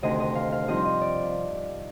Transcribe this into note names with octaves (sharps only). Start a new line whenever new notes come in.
D2 C3 D#3 D#5
D#5
F5
F5
G2 F3 C4 D#4 D#5
D#5
D5